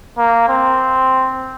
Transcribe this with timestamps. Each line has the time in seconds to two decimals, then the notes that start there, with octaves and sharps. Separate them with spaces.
0.18 A#3
0.49 C4